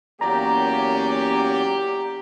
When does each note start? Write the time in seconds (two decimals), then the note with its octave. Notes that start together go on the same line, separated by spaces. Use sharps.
0.21 E2 F#3 A#3 C#4 G4 D5 A#5